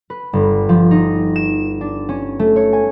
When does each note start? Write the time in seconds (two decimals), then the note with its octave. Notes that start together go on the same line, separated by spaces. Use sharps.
0.10 B4
0.33 G1
0.69 F3
0.91 D#4
1.36 E7
1.81 D4
2.09 C#4
2.39 A3
2.56 C#5
2.73 G#5